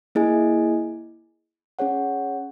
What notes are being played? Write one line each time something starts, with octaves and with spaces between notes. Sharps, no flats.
A#3 E4 G#4 D#5 G#5
C#4 G#4 C#5 F#5